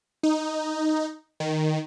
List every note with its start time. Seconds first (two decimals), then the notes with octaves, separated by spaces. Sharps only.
0.23 D#4
1.40 D#3